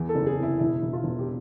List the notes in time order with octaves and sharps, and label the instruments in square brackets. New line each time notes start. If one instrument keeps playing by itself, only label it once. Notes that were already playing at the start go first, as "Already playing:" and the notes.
Already playing: [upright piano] E2 E3
A4
F#1
G#4
C3 E4
E1 E4
E1
F4
E1
G4